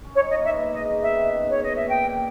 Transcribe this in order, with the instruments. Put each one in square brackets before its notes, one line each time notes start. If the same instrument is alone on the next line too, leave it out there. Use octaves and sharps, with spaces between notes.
[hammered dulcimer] C#4
[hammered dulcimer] D#4 [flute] C#5
[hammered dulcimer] D#4 [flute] D#5
[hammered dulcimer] A#3 B3 [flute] E5
[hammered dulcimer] B3
A#3
[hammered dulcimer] G#3 [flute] D#5
[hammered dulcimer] A#3
[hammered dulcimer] B3 [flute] E5
[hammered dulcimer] D#3
C#3
[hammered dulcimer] B2 [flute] C#5
[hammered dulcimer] A#2 [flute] D#5
[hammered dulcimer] B2 [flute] E5
[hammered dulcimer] A#2 [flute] G5
[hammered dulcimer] A#2